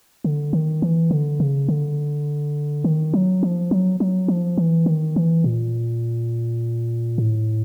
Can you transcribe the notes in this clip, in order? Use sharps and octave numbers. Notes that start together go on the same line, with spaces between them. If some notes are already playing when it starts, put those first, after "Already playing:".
D3
D#3
E3
D3
C#3
D3
D#3
F#3
F3
F#3
F#3
F3
E3
D#3
E3
A#2
A2